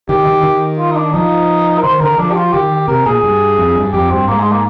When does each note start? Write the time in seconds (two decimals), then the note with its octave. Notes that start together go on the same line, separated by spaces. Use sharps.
0.09 D#3 G4
0.27 D#3
0.43 D#3
0.79 F4
0.91 D#4
0.96 D4
1.13 F3 D#4
1.78 A#4
1.83 D#3 C5
2.01 D3 A#4
2.18 F3 D4
2.31 G4
2.36 F4
2.53 D#3 G4
2.88 C3 A#4
3.06 A#2 G#4
3.23 G2
3.58 F2
3.75 G2
3.93 F2 G4
4.10 G2 C4
4.28 G#2 A#3
4.39 G#3
4.51 A#3